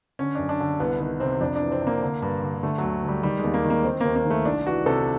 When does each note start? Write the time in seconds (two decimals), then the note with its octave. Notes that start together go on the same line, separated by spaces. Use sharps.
0.19 D3 C#4
0.35 F#2 D4
0.49 D4
0.60 D3
0.80 C2 B3
1.00 D#3 B3
1.20 C3 C4
1.40 F2 D4
1.56 D4
1.61 E3
1.72 C4
1.82 C3 A#3
2.02 D3
2.22 G2
2.43 D3
2.63 D3 A3
2.78 D2 F#3
3.03 D3 G3
3.23 D#3 G3
3.39 D#2 G#3
3.54 A#3
3.64 D#3
3.70 A#3
3.84 D#3 C4
4.01 D#2 A#3
4.16 A#3
4.25 D#3
4.30 A3
4.45 C2 D4
4.66 E3 F#4
4.86 C3 A4